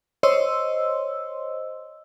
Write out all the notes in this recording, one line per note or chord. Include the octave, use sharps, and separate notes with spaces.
C5 C#5 D#5 C6 E6